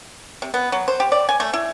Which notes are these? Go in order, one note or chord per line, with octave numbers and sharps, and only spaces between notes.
C3
B3
F#3
C5
G4
D5
G#5
A3
E4